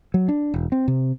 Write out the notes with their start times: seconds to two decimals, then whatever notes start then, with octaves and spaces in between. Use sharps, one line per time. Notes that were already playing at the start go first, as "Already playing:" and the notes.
0.14 F#3
0.28 D4
0.54 E1
0.72 C4
0.88 C3